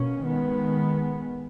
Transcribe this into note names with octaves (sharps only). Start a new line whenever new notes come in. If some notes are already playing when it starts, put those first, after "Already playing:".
Already playing: B2 A#3 C#4
D#3 G#3 B3